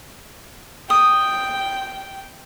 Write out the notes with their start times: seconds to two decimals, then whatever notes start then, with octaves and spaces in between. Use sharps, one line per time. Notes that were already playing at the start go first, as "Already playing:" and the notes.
0.90 G5 D#6